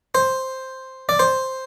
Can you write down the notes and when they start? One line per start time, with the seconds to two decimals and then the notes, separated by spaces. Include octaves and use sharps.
0.15 C5
1.09 D5
1.19 C5